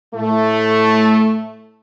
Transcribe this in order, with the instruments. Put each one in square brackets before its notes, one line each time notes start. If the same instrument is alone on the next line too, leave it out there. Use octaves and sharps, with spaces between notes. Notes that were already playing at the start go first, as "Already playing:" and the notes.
[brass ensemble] A2 A3